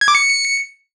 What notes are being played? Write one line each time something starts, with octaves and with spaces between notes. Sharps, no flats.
G#6
D6
C#7